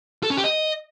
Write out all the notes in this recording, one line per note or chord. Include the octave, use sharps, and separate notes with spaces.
A4
C#4
G4
D#5